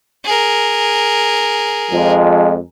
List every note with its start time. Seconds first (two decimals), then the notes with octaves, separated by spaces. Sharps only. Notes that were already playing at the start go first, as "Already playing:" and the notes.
0.25 G#4 A#4
1.91 F2 F3 G#3